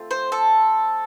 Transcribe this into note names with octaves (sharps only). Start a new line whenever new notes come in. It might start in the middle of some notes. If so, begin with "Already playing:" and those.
Already playing: A3 C4 F4
C5
A4